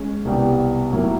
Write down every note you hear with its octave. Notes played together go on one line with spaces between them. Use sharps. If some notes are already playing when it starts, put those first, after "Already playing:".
Already playing: G#3 C#4
C2 B2 G3
A2 F#3 A#3